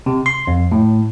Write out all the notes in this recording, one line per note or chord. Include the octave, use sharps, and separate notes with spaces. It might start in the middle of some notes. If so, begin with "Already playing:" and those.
C3
C6
F2
A2